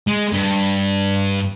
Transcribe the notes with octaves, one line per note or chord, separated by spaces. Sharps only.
G#3
G2